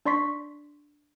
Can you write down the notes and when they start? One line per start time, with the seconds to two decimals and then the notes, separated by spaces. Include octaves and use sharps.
0.05 D4 D5 C6 C#6 B6